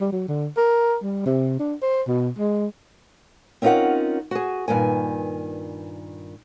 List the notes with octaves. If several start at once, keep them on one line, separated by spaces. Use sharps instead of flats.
G3
F#3
D3
A#4
G3
C3
D4
C5
B2
G#3
C4 C#4 D#4 F4 A#4 F#5
F#4 G#4
G2 A#2 D#3 G#5